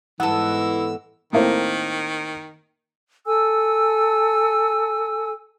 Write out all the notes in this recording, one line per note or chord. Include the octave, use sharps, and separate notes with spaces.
G#2 E3 B3 A4 F#5 E6
A2 D#3 A#3 C4
A4 G#5 E6